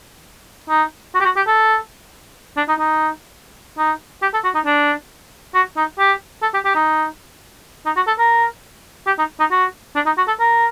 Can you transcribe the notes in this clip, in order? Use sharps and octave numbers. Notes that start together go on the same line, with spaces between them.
D#4
F#4
G4
F#4
G4
A4
D4
D#4
D#4
D#4
G4
A4
F#4
D#4
D4
F#4
D#4
G4
A4
G4
G4
D#4
D#4
F#4
A4
A#4
G4
D#4
D#4
F#4
D4
D#4
F#4
A4
A#4